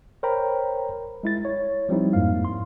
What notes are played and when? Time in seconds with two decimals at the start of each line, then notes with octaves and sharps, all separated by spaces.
0.23 A#4 C5 C#5 G5 A#5 B5
1.23 G#3 E4 A6
1.45 C#5
1.89 F3 G3 C4 D#4 E4
2.13 F2 G#2 A#3 F5
2.45 C6